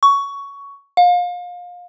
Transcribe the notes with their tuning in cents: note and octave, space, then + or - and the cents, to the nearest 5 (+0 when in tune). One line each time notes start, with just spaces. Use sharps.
C#6 +15
F5 +25